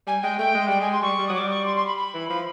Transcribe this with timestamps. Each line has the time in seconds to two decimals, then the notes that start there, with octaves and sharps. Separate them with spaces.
0.07 G3 G#5
0.22 G#3 G5
0.39 A3 G5
0.54 G#3
0.67 G3 G5
0.80 G#3 G#5
0.92 C6
1.02 G3 C#6
1.19 G3
1.28 F#3 D#6
1.35 G3 D6
1.50 C#6
1.66 C6
1.76 C6
1.87 B5
1.97 B5
2.14 E3
2.30 F3 B5